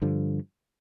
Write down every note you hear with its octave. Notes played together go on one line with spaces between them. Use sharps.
G2 D3 F3